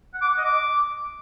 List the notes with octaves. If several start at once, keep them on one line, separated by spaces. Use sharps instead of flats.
F#5
D6
F#5
D#5
D6